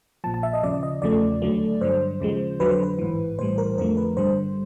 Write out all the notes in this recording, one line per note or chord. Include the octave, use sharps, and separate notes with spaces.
A#1 A#2 F3 A5
A5
E5
D#5
D#2 C#3 F3 D5
D5
D#5
E2 C#3 F3 A3 D5
D#2 D3 F#3 A3
G2 D3 F#3 C5
D#2 C#3 F3 G#3
F2 D3 F#3 B4
C5
B4
A1 G#2 E3
A#1 A2 E3 G3 C5
A#4
F2 D3 F3 A3 A#4
B4
G#1 G2 D3 G3 C5